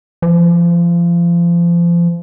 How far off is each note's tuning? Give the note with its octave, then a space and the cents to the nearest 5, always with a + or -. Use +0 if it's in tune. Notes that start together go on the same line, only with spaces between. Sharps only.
F3 -30